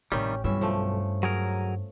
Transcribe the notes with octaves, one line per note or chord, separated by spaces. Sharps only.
A1 C3 D#3 G3 C#4 G4
B1 G2 E3 C#4 E5
F3 A3
F#3 G#4 A#4